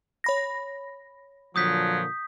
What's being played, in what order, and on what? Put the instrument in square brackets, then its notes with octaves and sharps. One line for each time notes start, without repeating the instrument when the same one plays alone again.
[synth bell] C#5 B5 A#6
[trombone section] A#2 D3 F3 [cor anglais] F#3 [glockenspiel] D#6 G6 B6